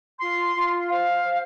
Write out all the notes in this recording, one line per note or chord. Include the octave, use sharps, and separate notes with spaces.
F4 C6
F4
C5 F5
C5